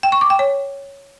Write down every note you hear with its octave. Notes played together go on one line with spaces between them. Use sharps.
G5
C#6
D6
G5
C#5